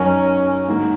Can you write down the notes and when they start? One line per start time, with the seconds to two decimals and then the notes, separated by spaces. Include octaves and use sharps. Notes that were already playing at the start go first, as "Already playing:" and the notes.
Already playing: F#2 F#3 C#4 D#4 A#4
0.68 G#2 D#3 A#3